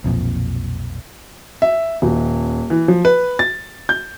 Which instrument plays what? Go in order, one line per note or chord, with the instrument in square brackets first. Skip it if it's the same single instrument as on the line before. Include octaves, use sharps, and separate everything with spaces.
[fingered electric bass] B1 F2 A#2
[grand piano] E5
D#1
E3
F3
B4
A6
G6